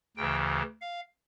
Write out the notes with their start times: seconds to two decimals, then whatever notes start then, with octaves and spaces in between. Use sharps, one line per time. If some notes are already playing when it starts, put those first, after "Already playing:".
0.17 D2 C#3 E3 G5
0.81 F5